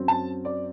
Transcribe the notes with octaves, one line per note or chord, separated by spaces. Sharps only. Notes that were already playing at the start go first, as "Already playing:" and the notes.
Already playing: F#2 F#3 C4
A5
D5